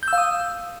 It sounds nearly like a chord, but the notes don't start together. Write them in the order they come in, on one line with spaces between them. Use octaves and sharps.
G6 E6 F5 D#6